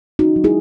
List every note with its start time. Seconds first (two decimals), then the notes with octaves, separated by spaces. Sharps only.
0.19 C#4 D#4 F#4
0.36 F#3
0.44 E4 G#4